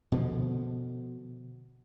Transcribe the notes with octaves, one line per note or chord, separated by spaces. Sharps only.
B2 D3 F3